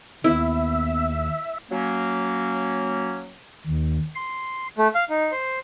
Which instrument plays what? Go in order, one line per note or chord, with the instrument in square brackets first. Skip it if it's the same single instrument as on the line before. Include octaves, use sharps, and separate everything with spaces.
[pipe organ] D#2 [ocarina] B3 [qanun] E4 [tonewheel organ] E5
[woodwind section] F#3 A#3 C#4
[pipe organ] D#2
C6
[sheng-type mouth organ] A3
F5
D#4
C5